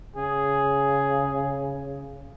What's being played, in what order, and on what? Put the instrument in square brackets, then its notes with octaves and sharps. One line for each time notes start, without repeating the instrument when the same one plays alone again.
[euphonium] C#3 [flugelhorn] G#4